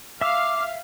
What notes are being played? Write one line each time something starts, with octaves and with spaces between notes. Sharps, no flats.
E5 F5 D6 E6